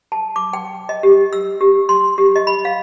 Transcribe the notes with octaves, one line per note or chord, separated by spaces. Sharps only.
A5
D6
G5
D#5
G4
E6
G4
C6
G4
D#5
B5
F5